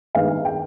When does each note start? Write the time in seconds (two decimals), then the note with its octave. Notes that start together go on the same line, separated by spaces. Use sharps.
0.15 G2 D#3 G#3 B3 D4 F5
0.45 G5